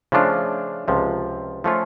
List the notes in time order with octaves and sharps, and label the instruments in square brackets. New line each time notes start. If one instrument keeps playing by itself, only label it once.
[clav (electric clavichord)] C#3 F3 A3 D4 F4
C#2 C3 F3
F3 A3 C#4 F4